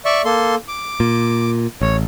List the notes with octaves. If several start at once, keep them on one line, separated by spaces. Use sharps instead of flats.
D5 E5 C#6
A#3 A4 C6
D6
A#2
A1 C#5